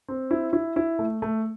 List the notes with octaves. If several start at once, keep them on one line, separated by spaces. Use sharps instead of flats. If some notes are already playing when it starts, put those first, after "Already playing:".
C4
E4
E4
E4
A3
A3